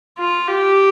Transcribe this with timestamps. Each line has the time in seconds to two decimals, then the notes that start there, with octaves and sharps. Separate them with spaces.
0.19 F4
0.47 G4